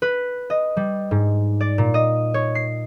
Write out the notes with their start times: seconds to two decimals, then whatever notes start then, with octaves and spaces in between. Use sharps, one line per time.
0.02 B4
0.50 D#5
0.77 G3
1.11 G#2
1.61 D5
1.78 A#2
1.94 D#5
2.34 C#5
2.55 C7